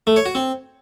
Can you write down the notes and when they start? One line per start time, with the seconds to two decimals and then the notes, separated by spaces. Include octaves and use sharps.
0.07 A3
0.16 C#5
0.26 F#4
0.35 C4